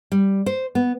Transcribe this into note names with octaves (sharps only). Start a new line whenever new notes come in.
G3
C5
B3